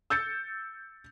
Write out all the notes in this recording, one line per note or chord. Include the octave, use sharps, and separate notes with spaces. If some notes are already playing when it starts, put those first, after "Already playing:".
E6 G6 A6 C#7